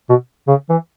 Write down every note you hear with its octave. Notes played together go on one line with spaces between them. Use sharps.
B2
C#3
E3